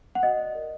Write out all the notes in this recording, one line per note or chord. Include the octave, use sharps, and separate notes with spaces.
F#5
F#4 D#5
D5
A#4